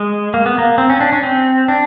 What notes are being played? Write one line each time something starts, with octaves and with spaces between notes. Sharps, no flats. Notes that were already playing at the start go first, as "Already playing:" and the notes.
Already playing: G#3
A#3
B3
A#3
C4
C#4
D4
C#4
C4
D4